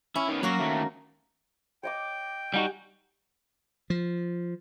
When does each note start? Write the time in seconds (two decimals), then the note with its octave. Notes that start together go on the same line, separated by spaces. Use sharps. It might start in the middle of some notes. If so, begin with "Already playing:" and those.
0.16 C#4 E4
0.28 D#3 B3
0.43 F#3 A#3 F#4
0.60 D#2 A3
1.83 C#5 D#5 G5 D6
2.54 G3 D#4 F#4 G4 F#5 G#5
3.90 F3